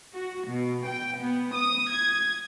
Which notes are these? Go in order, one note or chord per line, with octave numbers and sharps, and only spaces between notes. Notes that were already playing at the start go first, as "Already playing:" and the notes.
F#4
B2
G5
B3
D#6
G#6